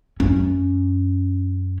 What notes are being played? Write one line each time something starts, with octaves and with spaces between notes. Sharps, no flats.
F#2 C#4